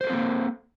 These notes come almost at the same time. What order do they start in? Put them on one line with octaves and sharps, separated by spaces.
C5 A3 A4 C4 A#3